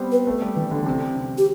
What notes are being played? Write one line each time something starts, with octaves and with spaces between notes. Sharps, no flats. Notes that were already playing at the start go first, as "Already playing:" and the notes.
Already playing: G3 B3 C4
B4
A3
G3
E3
D3
D3
C3
C3
G4